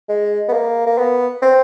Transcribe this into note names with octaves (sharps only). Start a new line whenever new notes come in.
G#3
B3
A#3
A#3
B3
C4